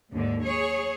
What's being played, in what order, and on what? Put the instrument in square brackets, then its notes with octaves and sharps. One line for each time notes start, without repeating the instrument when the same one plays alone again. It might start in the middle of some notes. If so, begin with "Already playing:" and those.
[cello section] D#2 G#2 D3
G#4 C#5